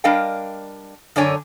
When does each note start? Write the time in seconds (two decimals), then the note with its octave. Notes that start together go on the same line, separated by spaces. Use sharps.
0.04 G3 D4 A#4 D#5 F5 G5
1.16 F#2 D3 D4 C#5 G#5